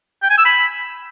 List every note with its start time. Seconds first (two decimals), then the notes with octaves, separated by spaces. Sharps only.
0.23 G5
0.30 G#5
0.38 E6
0.45 B5